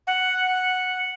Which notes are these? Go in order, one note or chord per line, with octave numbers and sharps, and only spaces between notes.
F#5